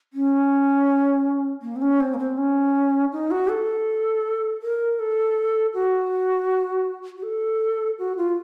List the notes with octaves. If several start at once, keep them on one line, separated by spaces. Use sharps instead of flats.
C#4
A#3
C4
C#4
C4
A#3
C4
C#4
D#4
F#4
A4
A#4
A4
F#4
F#4
A4
F#4
F4